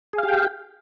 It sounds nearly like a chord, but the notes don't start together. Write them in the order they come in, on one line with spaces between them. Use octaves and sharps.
G#4 F5 G4 G5